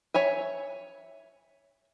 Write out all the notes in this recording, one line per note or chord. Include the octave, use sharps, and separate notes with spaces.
C#5 E5 G#5